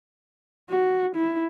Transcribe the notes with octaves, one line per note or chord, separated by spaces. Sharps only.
F#4
E4